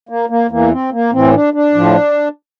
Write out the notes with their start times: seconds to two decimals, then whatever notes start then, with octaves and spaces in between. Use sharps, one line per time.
0.09 A#3
0.29 A#3
0.50 E2 E3 A#3
0.71 C4
0.92 A#3
1.12 A2 E3 C4
1.34 D4
1.54 D4
1.74 A2 F3